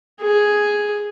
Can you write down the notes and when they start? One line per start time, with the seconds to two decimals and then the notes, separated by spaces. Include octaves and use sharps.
0.21 G#4